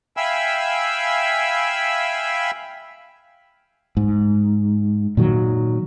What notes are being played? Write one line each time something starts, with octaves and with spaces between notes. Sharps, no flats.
E5 F5 G5 G#5 B5 E6
G#2
A#2 D#3 F#3